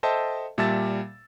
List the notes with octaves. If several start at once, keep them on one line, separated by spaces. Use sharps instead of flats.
A4 C5 D#5 E5 G5 A5
A#2 G3 E5 A5 E6 A6